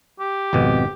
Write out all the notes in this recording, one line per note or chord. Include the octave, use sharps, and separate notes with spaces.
G4
G#1 F2 B2